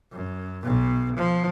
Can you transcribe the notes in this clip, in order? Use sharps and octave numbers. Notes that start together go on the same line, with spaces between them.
F#2
B1 B2
F3